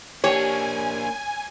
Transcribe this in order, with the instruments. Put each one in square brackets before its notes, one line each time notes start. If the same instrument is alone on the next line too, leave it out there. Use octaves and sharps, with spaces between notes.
[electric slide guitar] A#3 D4 [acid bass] G4 [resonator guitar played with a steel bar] C#5 [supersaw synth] G#5